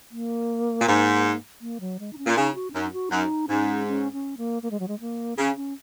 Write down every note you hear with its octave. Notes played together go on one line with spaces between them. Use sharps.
A#3
A#2
G#2
A#3
F#3
G#3
D#4
C#4
A#2
C#3 D#4
F#4
C#4
F#2 D#4
F#4
F#2 D#4
G#2 C#4
C#4
C#4
A#3
A#3
G#3
F#3
G#3
A#3
C#3 C#4
C#4